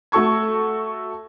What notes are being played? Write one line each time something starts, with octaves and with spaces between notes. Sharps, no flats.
A3 F#4 A4 C#6 G#6